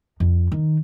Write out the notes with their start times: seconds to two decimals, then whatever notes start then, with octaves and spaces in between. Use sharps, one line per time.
0.20 F2
0.52 D#3